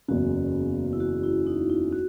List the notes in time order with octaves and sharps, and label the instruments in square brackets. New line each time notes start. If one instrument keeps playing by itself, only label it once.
[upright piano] F#1 E2 C#3 [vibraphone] F#4
[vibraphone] E4
F#4
E4
D#4
E4
F#4